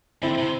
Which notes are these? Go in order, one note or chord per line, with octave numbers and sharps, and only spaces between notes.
D3 C4 E4
C3